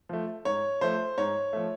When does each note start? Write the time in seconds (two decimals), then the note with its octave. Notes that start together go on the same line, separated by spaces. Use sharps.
0.09 F3 A3
0.45 G#2 C#5
0.81 F3 A3 C5
1.18 G#2 C#5
1.53 F3 A3